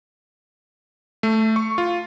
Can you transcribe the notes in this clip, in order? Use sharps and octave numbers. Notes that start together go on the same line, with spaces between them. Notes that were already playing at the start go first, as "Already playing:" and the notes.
A3
C#6
F4